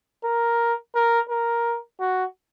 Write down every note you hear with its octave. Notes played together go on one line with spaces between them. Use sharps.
A#4
A#4
A#4
F#4